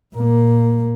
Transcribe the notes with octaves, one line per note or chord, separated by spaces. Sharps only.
A#2 A#3